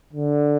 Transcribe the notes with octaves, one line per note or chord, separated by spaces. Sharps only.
D3